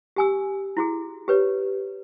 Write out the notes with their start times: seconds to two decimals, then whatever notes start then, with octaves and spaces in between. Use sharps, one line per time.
0.16 G4 G#5 E6
0.77 E4 F#4 G#4
1.28 G4 B4 C#5